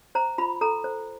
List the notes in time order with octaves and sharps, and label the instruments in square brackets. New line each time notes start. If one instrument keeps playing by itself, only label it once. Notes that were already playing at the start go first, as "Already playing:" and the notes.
[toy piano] C5 A#5
F4 B5
A4 A#5
C5